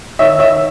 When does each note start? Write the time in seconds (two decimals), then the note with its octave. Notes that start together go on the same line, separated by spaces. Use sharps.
0.19 D#3 C#5 E5
0.39 C#5 E5